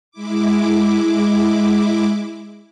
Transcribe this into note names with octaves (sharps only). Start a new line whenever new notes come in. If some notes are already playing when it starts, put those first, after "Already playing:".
G#3 E4 D6